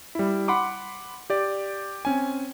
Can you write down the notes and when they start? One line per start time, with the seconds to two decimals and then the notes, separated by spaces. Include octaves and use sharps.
0.15 G3 E4
0.48 F#5 B5 C6 D6
1.30 G4 D5
2.05 C4 C#4 G#5